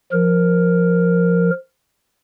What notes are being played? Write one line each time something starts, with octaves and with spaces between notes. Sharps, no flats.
F3 A#4